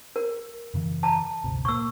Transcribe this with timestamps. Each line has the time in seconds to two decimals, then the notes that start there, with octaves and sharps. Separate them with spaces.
0.16 A#4
0.74 F#2 C#3 E3
1.03 A5 A#5
1.44 G1 D2 C3
1.65 A#2 A#3 C#6 E6